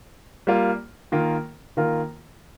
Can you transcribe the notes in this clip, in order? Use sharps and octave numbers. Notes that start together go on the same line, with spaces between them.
G3 A#3 F4
D#3 A#3 F4 A#4
D#3 A#3 F4 A#4